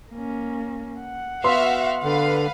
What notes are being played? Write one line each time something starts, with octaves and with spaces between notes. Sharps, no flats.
A#3 C#4
F#5
B3 F#4 E5 F5 C6
D3 B4 F5